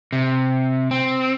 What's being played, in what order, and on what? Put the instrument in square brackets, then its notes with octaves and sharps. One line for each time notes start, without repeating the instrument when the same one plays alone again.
[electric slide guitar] C3
C4